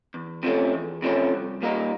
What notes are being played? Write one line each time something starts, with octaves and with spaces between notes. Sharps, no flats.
E2
C3 F3 A3 C#4
E2
C3 F3 A3 C#4
C2
A#2 G3 A#3 D#4